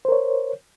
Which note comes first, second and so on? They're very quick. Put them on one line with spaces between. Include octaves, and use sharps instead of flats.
C5 A#4 C#5